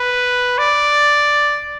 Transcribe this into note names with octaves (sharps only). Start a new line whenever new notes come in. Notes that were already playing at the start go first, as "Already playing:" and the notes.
Already playing: B4
D5